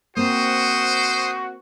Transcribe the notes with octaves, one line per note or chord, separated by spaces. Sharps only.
A#3 C4 F#4 C5 D#6